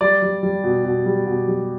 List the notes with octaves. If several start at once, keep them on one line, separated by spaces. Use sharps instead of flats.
G3 D5
G3
G3
B2
B2
G3
B2
G3